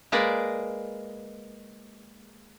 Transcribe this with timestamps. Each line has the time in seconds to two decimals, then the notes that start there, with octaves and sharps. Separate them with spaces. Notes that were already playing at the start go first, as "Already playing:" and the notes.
0.12 G#3 A#3 B4 D5